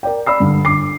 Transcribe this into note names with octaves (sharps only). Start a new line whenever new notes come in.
A#4 D5 G5
D5 B5 E6 C7
G2 D3
G1 D6 C7